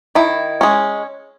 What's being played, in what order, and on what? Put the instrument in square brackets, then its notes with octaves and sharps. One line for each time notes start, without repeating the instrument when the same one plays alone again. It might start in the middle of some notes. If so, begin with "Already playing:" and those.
[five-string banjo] D#3 E4
G#3 C#4